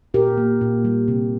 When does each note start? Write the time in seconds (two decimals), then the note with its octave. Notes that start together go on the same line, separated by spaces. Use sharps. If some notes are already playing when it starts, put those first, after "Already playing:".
0.14 A#2 G4 A#4
0.37 A#3
0.61 A#2
0.85 G3
1.08 C3